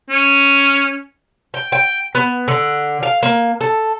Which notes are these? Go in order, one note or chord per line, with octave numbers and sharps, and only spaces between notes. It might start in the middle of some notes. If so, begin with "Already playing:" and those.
C#4
G5
G5
B3
D3
F5
A#3
A4